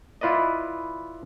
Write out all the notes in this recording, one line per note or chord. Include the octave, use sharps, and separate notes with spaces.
E4 F4 B4 D5 D#5